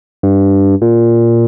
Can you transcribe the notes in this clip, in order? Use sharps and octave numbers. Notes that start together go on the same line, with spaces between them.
G2
A#2